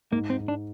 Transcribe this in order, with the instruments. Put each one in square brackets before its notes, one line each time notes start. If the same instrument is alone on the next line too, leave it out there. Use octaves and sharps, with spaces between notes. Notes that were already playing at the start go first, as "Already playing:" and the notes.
[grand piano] G#2 [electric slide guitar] A#3
[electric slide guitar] C4
[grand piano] G#2
[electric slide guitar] D4